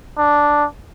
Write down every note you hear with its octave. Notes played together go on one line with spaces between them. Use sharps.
D4